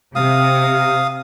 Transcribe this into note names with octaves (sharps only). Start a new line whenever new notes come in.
C3 F5 D#6